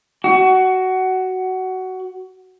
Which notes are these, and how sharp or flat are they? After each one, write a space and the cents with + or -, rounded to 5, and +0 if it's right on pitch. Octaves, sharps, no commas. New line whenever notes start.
F#4 +15